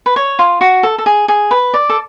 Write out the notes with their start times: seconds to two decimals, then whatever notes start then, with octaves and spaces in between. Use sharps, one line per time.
0.06 B4
0.16 C#5
0.39 F4
0.61 F#4
0.83 A4
0.98 A4
1.06 G#4
1.28 G#4
1.51 B4
1.74 D5
1.89 A4